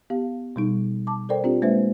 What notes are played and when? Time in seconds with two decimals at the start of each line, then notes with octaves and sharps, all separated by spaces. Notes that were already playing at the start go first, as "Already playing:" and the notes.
0.10 B3 G4 F5
0.56 B2 G3 D#4
1.07 A5 D6
1.29 A4 A#4 C5 D5 G5
1.44 C4 D4 F4 G4
1.62 G#3 A#3 D4 B4 C5 E5